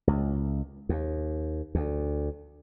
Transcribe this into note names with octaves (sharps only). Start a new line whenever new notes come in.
C#2
D#2
D2